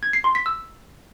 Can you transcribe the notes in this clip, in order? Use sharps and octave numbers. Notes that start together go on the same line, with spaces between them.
G#6
C7
C6
B6
E6